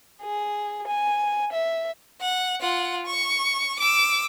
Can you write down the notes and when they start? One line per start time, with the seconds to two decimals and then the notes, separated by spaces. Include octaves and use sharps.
0.22 G#4
0.88 G#5
1.52 E5
2.21 F#5
2.61 F4 F#5
3.07 C#6
3.80 D6 E6